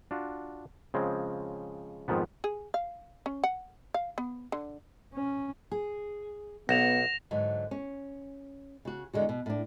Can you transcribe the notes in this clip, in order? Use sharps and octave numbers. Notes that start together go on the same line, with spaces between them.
D4 F4 F#4
C#3 F3 G#3 C4
F2 G#2 D#3 F3 B3
G#4
F5
C#4
F#5
F5
B3
D3
C#4
G#4
B1 B3 F#5 A#6 E7 F7
G#2 D3 F#3
C#4
C#3 F#4
E2 D3 G#3 F#4
B2
A2 D4